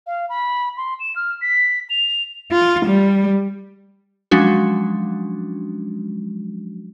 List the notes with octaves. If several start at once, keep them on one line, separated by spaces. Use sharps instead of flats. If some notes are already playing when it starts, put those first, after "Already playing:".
F5
B5
C6
E7
F6
B6
F7
F4
G3
F3 F#3 G#3 C#4 D4 F#4